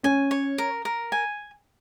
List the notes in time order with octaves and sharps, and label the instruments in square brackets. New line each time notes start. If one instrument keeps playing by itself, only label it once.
[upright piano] C#4 [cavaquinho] G#5
[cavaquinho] C#5
A#4
A#4
G#5